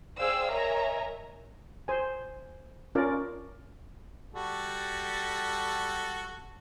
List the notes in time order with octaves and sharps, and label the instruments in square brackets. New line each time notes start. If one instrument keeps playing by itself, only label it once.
[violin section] G#4 C5 D5 F5 G5 E6
A#4 C#5 D#5 E5 G#5 A#5
[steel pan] C5 G#5
C#4 F4 A#4 D5
[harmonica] G3 F#4 A4